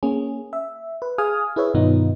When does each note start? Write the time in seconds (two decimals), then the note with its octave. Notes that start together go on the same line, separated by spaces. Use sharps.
0.03 A#3 C#4 G#4
0.53 E5
1.02 B4
1.18 G#4 F5 G#5 D#6 F6
1.56 E4 G#4 B4 C#5 E5
1.74 G2 B2 D#3 B3 D#4 F4